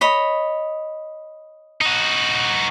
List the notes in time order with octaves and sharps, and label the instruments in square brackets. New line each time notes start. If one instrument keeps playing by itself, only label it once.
[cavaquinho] C#5 D#5 B5
[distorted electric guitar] D#4 F#4